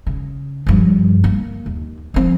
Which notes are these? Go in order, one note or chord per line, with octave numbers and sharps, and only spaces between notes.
C#3
G2 F3
A#3
D#2
F3 C4